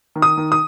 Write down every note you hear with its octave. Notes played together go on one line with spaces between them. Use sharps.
D#3
D#6
D#3
D#6